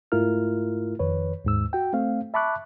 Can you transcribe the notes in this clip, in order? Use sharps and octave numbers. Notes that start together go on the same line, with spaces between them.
G#2 A3 E4 F4 A#4 F6
F2 D#3 B4 C#5
D#2 G#2 E6
F#4 G5
A3 C4 F5
E5 A5 B5 C#6 D6 F#6